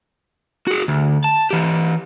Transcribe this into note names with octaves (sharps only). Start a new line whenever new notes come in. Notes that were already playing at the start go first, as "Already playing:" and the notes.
F#4 G#4
D2
A5
E3 G4